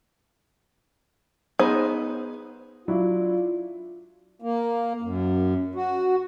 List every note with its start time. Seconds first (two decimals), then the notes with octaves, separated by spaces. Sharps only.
1.59 B3 D#4 G#4 C5
2.88 F#3 D4 E4 F4
4.42 A#3
5.02 F#2
5.75 F#4